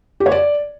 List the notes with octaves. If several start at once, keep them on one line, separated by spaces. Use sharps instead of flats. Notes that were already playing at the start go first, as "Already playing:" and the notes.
G4
C#5
D5